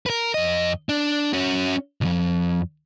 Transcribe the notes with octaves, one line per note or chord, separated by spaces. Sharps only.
A#4 B4
F2 D#5
D4
C#4 F#4
B1 F2